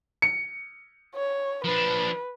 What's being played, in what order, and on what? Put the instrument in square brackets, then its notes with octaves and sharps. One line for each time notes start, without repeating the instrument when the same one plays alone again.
[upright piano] C#7
[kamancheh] C#5
[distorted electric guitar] F3 D4 [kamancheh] B4